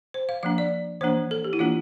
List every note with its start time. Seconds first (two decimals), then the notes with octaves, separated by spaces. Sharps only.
0.14 C5
0.29 F5
0.43 F3 A#3 D4 F5
0.58 D5
1.01 E3 A#3 D4 C5
1.31 A4
1.44 G4
1.53 E4
1.59 E3 A#3 D4 F4